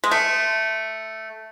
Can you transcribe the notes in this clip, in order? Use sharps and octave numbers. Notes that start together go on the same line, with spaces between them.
G#3
A3